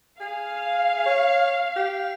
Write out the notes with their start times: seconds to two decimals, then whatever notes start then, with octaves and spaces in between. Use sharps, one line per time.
0.20 G#4 F5
1.06 C#5
1.76 G4